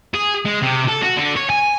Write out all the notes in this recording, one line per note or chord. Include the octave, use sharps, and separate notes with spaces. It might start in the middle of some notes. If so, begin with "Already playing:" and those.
G#4
G#3
C3
A4
F#4
D3
C#5
G#5